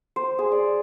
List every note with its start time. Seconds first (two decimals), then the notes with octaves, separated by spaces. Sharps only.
0.16 C5
0.39 G#4
0.52 D5